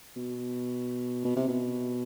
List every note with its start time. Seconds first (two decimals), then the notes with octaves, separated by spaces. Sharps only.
0.16 B2
1.25 B2
1.36 C3
1.48 B2